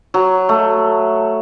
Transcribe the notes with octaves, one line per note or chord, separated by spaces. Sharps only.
F#3
A3